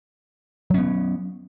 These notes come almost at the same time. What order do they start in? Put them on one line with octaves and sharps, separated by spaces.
F#3 C#4 B3